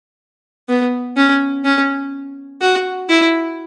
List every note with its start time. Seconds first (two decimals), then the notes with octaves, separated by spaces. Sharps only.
0.69 B3
1.17 C#4
1.65 C#4
2.61 F#4
3.09 E4